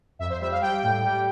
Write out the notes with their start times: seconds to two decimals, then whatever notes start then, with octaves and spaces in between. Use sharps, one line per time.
0.19 F2 E5
0.30 C5
0.40 G3 E5
0.51 F5
0.61 G3 G5
0.83 A2
1.04 G3